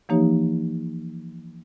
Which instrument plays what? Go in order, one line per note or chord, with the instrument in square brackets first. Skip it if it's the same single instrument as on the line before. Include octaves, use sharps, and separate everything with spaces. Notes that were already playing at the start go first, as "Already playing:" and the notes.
[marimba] E3 F3 A#3 D#4 G4 C#5